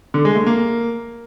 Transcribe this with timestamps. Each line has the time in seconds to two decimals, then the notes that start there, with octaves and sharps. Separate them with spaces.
0.14 D3
0.25 G#3
0.36 A3
0.46 A#3